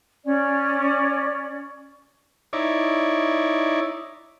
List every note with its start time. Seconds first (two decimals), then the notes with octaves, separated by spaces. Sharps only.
0.24 C#4 D5
2.53 D#4 E4 C#5 D5